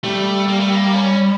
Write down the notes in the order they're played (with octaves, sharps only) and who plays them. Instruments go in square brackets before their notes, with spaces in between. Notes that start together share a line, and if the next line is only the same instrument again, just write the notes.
[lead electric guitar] G3 [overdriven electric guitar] A3
[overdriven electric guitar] A#3
A3
A#3
C#4